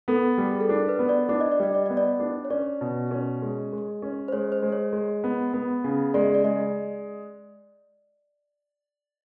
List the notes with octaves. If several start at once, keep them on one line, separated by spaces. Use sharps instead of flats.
B3 A4
G3
G#4
A4
D4 A#4
B4
B3
D5
D4 D5
D#5
D5
G3 D#5
D5
B3 D#5
D5
D4
C#5
C#4 D5
B2
C#4
G#3
G#3
C#4
C5
G#3 C#5
C5
G#3
C#5
G#3
B3
B3
C#3
G#3 D5
D#5
D5
G#3 D#5